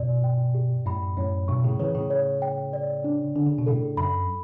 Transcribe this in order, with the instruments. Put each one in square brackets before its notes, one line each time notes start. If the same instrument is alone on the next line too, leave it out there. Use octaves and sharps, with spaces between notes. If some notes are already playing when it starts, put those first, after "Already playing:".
Already playing: [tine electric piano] G2 B2 [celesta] D5
[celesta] G5
G4
[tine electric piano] F#2 A2 [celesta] B5
[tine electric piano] F#2 A2 [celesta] C#5
[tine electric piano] G2 B2 [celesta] C#6
[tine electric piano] A2 C#3
[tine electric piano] C#3 E3 [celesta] C#5
[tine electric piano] A2 C#3
[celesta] C#5
G5
D5
D4
[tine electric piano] D3 [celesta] D4
[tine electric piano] C#3
B2
[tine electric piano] A2 C#3 [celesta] A4
[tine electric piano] F#2 [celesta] B5